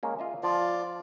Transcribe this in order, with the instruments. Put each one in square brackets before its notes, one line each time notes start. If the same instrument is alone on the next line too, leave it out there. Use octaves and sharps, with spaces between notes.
[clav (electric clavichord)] G#3 A#3 C#4
F4 D#5 E5
[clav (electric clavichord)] F3 [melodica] F4 D5